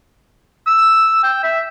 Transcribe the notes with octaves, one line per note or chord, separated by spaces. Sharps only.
E6
G5
E5